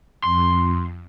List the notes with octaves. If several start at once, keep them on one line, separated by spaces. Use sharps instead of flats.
F2 C6